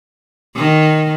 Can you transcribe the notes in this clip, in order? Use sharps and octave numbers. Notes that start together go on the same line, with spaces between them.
D#3